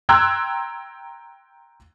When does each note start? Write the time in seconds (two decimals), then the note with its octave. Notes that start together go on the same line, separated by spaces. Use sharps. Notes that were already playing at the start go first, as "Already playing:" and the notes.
0.09 G5 A#5 C6 E6 F#6 G#6